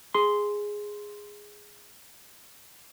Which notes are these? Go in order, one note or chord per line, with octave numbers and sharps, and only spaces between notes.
G#4 C6